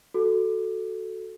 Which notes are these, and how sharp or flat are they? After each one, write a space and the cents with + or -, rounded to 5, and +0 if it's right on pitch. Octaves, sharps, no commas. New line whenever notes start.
F#4 +0 A4 +0